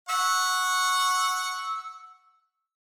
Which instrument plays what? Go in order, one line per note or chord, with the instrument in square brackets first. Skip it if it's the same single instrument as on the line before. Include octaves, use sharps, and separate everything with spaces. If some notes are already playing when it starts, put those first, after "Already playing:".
[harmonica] F#5 C#6 [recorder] E6